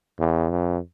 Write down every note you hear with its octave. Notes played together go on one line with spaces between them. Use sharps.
E2
F2